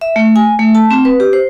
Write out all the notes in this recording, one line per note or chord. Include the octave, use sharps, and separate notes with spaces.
E5
A3
G#5
A3
A5
C4
B4
G4
C5